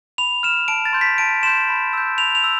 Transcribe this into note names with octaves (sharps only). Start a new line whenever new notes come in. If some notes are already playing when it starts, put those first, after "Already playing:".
B5 F7
F6 E7
A5 D7
A6
C6 G6
B6
A5 D7
C6 G6 E7
B5
E6 G6
B5 F7
F7
E6